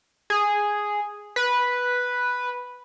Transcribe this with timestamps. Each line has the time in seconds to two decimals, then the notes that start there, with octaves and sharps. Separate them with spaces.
0.30 G#4
1.36 B4